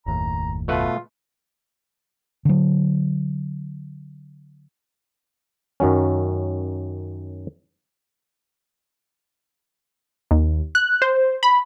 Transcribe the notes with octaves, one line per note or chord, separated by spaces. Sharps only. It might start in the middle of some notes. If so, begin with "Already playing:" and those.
F#1 D#2 A2 A#5
B2 A3 F4 B4
D3 F#3
F#2 D#3 F#3 C#4
D#2
F#6
C5
B5